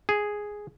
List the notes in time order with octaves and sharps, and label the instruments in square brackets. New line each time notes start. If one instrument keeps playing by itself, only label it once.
[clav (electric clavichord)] G#4